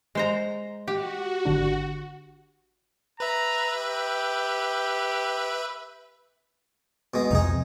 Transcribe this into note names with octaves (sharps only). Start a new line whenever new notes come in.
G#3 C5 A#5
F#4 G4
G#1 D3 D4
B4 E5 A#5
G4
B2 G#3
C2 F2 C3 D#4 G#4